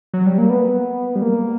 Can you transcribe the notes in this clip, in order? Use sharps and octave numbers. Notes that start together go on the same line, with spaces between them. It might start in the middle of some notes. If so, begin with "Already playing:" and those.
F#3
G3
A#3
B3
G3
A#3